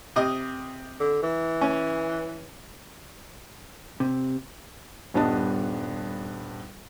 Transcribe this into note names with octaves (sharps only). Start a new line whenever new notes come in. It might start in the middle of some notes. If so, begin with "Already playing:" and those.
C3 D#5 D#6
D3
E3
C#4
C3
D#1 G2 B3 D4 D#5 A5